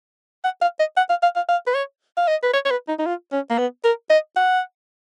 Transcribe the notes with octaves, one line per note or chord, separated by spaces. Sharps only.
F#5
F5
D#5
F#5
F5
F5
F5
F5
B4
C#5
F5
D#5
B4
C#5
C#5
B4
D#4
D#4
F4
C#4
A#3
B3
A#4
D#5
F#5